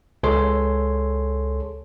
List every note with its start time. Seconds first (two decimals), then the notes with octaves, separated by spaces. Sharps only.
0.23 C#2 G#4 A4 C#5 C6